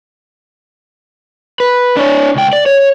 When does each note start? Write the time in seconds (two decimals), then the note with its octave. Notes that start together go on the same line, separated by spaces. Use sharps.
1.60 B4
1.97 D4 C#5
2.36 C#2 G5
2.53 D5
2.66 C#5